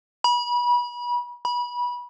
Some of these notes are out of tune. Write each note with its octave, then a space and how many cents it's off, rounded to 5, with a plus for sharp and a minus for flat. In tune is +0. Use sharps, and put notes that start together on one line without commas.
B5 -30
B5 -25